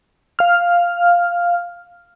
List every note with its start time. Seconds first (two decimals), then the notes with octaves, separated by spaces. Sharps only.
0.39 F5 F6